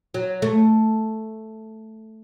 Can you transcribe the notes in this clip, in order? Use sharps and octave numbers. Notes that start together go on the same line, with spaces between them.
F#3
A3